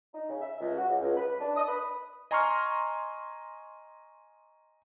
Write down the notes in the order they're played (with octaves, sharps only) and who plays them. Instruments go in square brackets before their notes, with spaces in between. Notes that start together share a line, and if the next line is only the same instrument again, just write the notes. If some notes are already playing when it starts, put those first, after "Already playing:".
[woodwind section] D#4
C#3
E5
C#2
F#4
C#2
C#2
B4
D4
D#6
B4
[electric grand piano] D#5 G#5 A#5 C6 C#6 F6